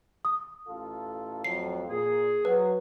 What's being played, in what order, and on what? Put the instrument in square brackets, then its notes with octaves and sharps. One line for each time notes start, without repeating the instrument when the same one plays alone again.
[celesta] D#6
[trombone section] A1 F4 A4
[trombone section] F2 A2 F#3 [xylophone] C7
[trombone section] A#2 [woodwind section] G#4
[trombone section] F#3 [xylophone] B4